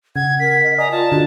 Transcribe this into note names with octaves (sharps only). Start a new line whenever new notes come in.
C#3 F#5 G#6
A#4 B6
D#5
D5 D#5 G#5 A#5
F4 D5 A5
D3 F#4